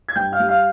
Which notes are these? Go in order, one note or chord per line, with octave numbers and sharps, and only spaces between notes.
G#6
G2 G5 G6
F5 F6
G3
F5 F6